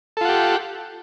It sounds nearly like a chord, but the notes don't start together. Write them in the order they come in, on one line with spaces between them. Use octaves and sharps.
A4 F4 F#5 G4